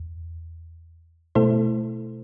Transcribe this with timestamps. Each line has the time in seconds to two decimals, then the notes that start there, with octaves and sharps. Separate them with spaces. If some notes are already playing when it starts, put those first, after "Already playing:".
Already playing: E2
1.35 B2 A3 E4 A4 C5